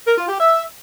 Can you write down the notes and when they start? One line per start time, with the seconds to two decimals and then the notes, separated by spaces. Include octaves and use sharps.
0.07 A#4
0.18 F4
0.29 G4
0.40 E5